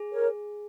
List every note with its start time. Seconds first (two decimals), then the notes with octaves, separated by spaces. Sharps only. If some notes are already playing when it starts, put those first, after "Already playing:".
Already playing: G#4
0.11 A#4 C#5